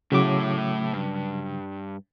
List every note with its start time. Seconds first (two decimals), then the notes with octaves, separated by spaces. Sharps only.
0.12 A2 C#3 F#3 E4 D6
0.94 G2